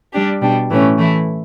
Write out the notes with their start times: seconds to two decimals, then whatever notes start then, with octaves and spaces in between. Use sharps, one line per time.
0.13 G3 D4 G4
0.41 B2 G3 D4
0.71 A2 E3 A3 C#4
0.98 E3 A3 E4